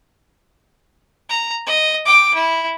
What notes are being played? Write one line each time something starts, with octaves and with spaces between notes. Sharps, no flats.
A#5
D#5
G5 D6
E4